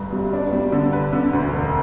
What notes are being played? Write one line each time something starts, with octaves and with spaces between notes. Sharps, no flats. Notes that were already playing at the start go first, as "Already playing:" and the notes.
Already playing: G1 G2
G3
D4
G3
D3
B4
D3
D2
E1